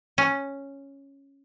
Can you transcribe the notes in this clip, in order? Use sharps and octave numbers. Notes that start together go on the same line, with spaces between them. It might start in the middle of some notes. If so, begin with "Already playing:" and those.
C#4